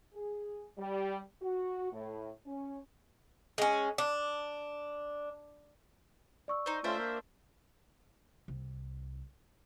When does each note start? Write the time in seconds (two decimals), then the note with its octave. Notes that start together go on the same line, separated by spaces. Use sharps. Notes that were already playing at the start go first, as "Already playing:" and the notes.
0.14 G#4
0.77 G3
1.42 F#4
1.92 A2
2.46 C#4
3.58 G#3 C#4
3.98 D4
6.48 D5 C#6 E6
6.66 D#4 C5
6.84 A3 C#4 D4 F4 C5 E5
6.98 A#3 A#4
8.48 C2